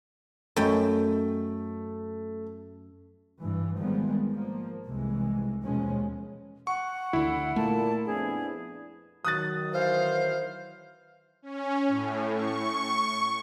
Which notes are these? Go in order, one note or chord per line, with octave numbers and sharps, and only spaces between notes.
F#2 A3 G5
G2 E3
G#1 D#3 F3 G3 G#3 B3
F3 A#3
F1 C2 C3 E3 G#3
D#2 B2 F3 G#3 C#4
F#5 C#6
D2 D3 E4
A#2 A3 A5
F2 B3 D4 G#4
D#3 F#3 D#6 F#6 A6
E3 C5 F5
C#4
A2
C#6